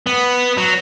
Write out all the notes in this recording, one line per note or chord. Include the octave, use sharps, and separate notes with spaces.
B3
F#3